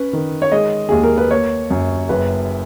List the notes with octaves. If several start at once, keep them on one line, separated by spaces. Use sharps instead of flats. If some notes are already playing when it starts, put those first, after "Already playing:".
Already playing: C#4 B4
D#3
C#5
G#3 D#5
D#2 G#4
A#4
B4
A#3 C#5
F#2
F#1 B4